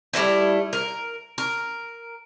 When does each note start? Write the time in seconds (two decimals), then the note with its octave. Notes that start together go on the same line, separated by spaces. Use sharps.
0.13 G3 A3 C4 E4
0.73 A#4
1.38 A#4